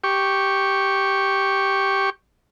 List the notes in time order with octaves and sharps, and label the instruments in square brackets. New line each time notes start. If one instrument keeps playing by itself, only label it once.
[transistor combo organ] G4 C#6